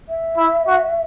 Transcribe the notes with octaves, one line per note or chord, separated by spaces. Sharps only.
E5
E4
F#4